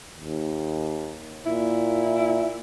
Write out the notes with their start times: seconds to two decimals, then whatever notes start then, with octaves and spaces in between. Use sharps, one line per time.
0.12 D#2
1.46 A#2 E4